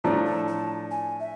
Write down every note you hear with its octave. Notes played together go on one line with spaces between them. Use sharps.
A2 F3 A3 D4 A#5
A5
A5
G#5
E5